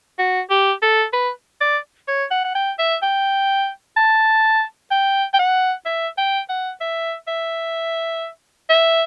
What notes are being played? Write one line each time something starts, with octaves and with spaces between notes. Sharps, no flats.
F#4
G4
A4
B4
D5
C#5
F#5
F#5
G5
E5
G5
A5
G5
G5
F#5
E5
G5
F#5
E5
E5
E5